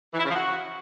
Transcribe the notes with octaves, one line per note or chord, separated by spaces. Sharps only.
E3
E4
C#3
F3
F#4